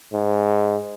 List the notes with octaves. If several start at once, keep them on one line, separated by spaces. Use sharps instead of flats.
G#2